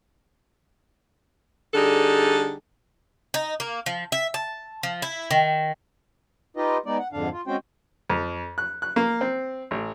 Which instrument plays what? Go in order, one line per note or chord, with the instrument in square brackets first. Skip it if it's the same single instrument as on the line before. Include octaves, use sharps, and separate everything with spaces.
[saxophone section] D3 G3 D#4 G#4 A4
[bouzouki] D#4
A#3
F3
E5
A5
F3
E4
D#3
[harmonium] D#4 F4 G4 B4 D#5
G#3 B3 D#4 D5
F#5
F2 G#2 D3 D4 F5
F4
G#3 C4 C#4 F#4 C5 G5
[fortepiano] F2
F#6
F#6
A#3
C4
A1